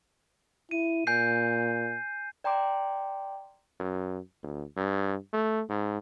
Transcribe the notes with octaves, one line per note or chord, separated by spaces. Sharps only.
E4 D#7
A#2 G#5 G6 C7
D5 G5 A#5 C6 D6
F#2
D2
G2
A3
G#2